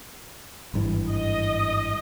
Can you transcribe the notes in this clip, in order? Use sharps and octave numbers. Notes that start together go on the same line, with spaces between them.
G#1 G2 E3
D#5